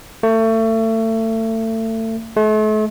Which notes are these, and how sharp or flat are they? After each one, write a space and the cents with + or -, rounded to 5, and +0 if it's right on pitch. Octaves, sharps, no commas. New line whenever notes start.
A3 +30
A3 -40